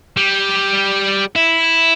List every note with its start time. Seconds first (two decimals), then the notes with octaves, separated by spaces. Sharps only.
0.17 G3
1.36 E4